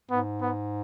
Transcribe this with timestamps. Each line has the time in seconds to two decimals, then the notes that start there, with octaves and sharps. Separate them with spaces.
0.11 G#2 B3
0.41 B3